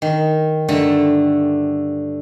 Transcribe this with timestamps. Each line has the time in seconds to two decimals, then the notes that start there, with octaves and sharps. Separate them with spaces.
0.02 D#3
0.68 G2 D3 A3 A4 A#5